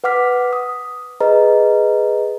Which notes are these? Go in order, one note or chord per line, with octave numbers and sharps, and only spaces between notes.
B4 F#5 D6 F6 B6
D#6
G#4 B4 D#5 A#5